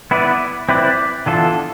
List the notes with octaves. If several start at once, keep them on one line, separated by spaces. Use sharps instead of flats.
B3 E4 B4 D5
C4 E4 B4 D5
E3 B3 D4 F4 A4